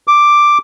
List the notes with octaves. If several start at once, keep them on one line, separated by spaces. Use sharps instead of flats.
D6